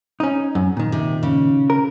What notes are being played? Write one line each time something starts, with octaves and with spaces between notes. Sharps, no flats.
C#4 D#4
F#2
A#2 D#3
C3
C#3
A#4